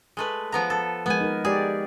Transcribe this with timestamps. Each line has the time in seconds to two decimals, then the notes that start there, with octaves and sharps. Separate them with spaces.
0.17 G#3 A3 B4
0.52 F3 B3 A#5
0.70 A4
1.06 F3 G#3 B3 A#4 G#5
1.21 D#4 A#4
1.45 G#3 G4 G#4 D5